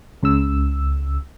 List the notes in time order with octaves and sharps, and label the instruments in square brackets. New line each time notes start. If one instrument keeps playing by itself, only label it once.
[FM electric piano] C#2 C#3 E6